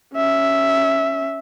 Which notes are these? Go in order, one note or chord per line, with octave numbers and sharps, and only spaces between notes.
C#4 E5